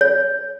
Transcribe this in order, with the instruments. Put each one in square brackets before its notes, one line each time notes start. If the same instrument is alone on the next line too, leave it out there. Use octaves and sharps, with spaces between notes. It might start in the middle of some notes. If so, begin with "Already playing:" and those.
[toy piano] C#5